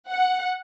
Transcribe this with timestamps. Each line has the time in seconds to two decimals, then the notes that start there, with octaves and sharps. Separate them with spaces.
0.10 F#5